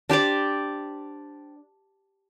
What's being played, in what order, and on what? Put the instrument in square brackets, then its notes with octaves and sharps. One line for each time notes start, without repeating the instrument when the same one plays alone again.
[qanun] D4 G4 C5 D5